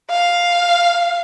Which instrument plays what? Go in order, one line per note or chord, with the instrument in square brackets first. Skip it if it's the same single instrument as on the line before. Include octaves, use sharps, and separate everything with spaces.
[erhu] F5